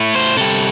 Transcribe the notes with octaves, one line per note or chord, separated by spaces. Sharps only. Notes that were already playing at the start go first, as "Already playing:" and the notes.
Already playing: A2 A3
C5
C3 G3 A4